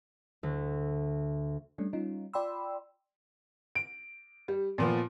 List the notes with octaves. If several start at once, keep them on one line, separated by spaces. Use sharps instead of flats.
D2
G3 A3 C#4 D4
G3 C#4 D#4 F4
F4 D5 G5 B5 C6 E6
D7
G3
A#2 F3 B3